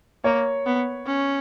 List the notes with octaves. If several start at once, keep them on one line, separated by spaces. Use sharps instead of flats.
A#3 C#5
B3
C#4